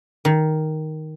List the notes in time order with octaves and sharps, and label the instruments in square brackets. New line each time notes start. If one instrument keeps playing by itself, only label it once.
[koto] D#3